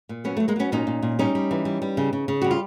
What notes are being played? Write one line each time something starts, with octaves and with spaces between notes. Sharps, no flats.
A#2
F#3 B3 C#4
F#3 A3
G#3 A#3
F#3 B3 C#4
A#2 C#4 D#4
A#2
A#2
G3 C#4 D#4
G3
E3
G3
G3
C#3
C#3
C#3
G3 F#4
F4